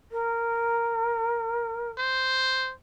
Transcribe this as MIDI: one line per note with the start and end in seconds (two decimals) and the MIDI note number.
0.12 1.91 70
1.98 2.72 72